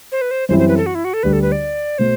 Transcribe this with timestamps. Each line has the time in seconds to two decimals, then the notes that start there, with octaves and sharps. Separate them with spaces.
0.12 C5
0.21 B4
0.31 C5
0.49 F#2 E3 G3 C4 E4 C5
0.59 C5
0.68 B4
0.77 A4
0.86 F#4
0.95 E4
1.05 F#4
1.14 A4
1.23 D2 D3 G3 B4
1.33 A4
1.42 B4
1.52 D5
1.98 B2 A3 C5